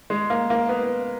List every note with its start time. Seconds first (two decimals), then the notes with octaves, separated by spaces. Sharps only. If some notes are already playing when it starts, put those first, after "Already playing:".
0.10 G#3
0.30 A#3
0.50 A#3
0.69 B3